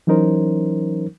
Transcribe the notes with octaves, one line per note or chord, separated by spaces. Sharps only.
E3 F#3 C#4 D#4 A#4 C5